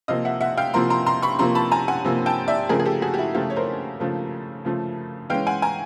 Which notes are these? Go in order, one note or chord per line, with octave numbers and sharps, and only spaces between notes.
C3 F3 A#3 D#5 F5
E5 F#5
E5 F#5
F5 G5
C3 F3 A#3 A#5 C6
A#5 C6
A#5 C6
B5 C#6
C3 F3 A#3 A#5 C6
A5 B5
G#5 A#5
F#5 G#5
C3 F3 A#3
G5 A5
D5 E5
C#3 F3 A3 G#4 A#4
G#4
G4 A4
F#4 G#4
G4
E4 F#4
C#3 F3 A3 F4 G4
C#5
A#4 C5
C#3 F3 A3
C#3 F3 A3
E3 G#3 C#4 F5 G5
F#5 G#5
G#5 A#5